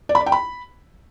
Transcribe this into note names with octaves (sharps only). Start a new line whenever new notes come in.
D5
B5
D5
G5
B5